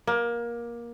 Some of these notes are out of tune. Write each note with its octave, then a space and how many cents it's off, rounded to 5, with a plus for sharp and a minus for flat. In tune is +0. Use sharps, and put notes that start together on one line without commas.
A#3 +20